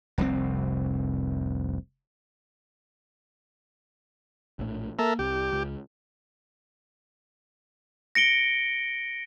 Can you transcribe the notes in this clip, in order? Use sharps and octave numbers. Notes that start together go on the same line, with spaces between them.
F1 C2 G#2 C4
A#1 A2
A#3 A4 A#4 E5
C2 G4
C#2
A#6 C#7 D7 G7